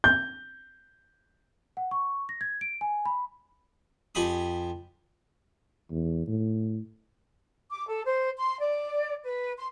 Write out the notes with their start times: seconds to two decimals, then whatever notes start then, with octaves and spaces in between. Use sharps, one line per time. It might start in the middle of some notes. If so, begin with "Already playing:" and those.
0.04 G6
1.77 F#5
1.91 C#6
2.29 A#6
2.41 G#6
2.61 D7
2.81 G#5
3.06 B5
4.15 F2 G4 G#5 B5 D#6
5.91 E2
6.28 A2
7.71 D6
7.88 A4
8.06 C5
8.37 C6
8.59 D5
9.24 B4
9.58 C6